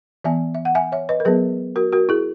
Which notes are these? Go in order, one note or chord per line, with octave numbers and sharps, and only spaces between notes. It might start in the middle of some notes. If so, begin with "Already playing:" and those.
E3 B3 E5 G#5
E5
F#5
E5 G#5
C#5 E5
B4 D#5
A#4
F#3 B3 G#4 B4
F#4 A#4
F#4 A#4
E4 G#4